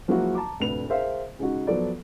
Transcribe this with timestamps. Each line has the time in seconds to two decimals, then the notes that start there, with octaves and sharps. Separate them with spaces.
0.08 F3 F#3 G#3 A#3 E4 F#4
0.35 A5 A#5 D6
0.60 F1 D2 A2 B4 F7
0.89 G#4 A#4 C5 E5 F5
1.39 C#3 G#3 D#4 F#4
1.67 F3 F#3 B3 A4 D5